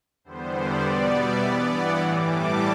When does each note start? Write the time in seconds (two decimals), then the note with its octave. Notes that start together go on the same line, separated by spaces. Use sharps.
0.24 E2 D3 G3 B3 C5
0.54 D5
0.83 B2 G3 B3
1.11 E5
1.40 G2 E3 B3 D5
1.70 F#5
1.99 A2 E3 G3 D6
2.28 A5